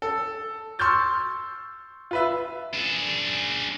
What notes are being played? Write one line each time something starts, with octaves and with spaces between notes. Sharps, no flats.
A4
C6 C#6 E6 F6 G6 A6
F4 B4 E5
D4 G#4